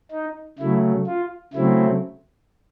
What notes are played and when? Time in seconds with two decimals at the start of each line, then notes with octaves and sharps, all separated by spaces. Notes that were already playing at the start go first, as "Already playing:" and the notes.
0.11 D#4
0.59 C#3 F#3 A3 E4
1.07 F4
1.54 C#3 F#3 A3 C4 E4